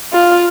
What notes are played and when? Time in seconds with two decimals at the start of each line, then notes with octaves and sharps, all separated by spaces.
0.12 F4